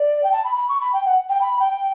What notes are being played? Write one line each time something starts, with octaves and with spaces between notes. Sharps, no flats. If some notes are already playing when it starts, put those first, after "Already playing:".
Already playing: D5
G5
A5
B5
B5
C#6
B5
G5
F#5
G5
B5
G5